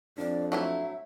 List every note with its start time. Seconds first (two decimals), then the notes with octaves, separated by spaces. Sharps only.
0.18 F2 D4 D5
0.52 F#3 A3 E4 E5